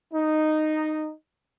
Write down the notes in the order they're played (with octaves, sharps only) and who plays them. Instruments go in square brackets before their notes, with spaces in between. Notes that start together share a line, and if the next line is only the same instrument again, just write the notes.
[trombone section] D#4